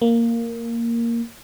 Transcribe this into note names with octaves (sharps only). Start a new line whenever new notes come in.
A#3